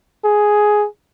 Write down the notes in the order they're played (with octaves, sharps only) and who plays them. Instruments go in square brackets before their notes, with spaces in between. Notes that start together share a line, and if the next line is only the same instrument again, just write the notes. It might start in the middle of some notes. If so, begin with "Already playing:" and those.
[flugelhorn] G#4